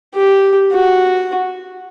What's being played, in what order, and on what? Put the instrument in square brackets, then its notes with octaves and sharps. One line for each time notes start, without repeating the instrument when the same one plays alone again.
[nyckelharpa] G4
F#4